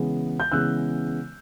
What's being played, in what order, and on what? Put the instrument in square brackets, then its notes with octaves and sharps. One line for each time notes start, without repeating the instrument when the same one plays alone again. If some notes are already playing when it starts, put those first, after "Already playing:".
Already playing: [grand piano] C#3 E3 G#3 B3
G6
C#3 E3 G#3 B3 E6 F#6